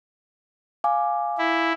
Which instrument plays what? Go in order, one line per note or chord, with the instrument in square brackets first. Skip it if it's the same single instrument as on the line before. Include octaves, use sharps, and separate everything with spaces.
[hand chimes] F5 G#5 D6
[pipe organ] E4